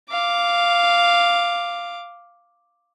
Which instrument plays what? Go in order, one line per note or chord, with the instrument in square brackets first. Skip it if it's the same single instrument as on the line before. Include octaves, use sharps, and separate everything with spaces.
[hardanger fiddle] F5 D6